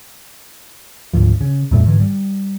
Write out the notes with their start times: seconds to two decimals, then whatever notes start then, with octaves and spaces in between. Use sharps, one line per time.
1.14 D2 G#2 F3
1.41 C#3
1.71 F2 A#2 G3 A3
1.85 G#2 D3 E3
2.00 G3